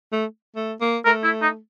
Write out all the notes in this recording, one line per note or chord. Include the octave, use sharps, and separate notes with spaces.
A3
A3
A#3
A3 A#4
E4
D#4